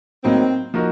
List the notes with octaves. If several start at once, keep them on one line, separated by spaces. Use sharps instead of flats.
A2 F#3 A#3 C4 D#4
F3 A#3 D#4 F#4 A#4